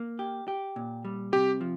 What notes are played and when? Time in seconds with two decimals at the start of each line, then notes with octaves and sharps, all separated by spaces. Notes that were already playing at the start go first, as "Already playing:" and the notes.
Already playing: A#3
0.19 G4
0.48 G4
0.76 A#2
1.04 G3
1.32 C3 G4
1.61 F3